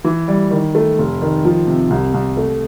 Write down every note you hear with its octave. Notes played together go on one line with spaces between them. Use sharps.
E3
G3
D#3
A3
F1
D#3
F3
C3
C2
C2
A3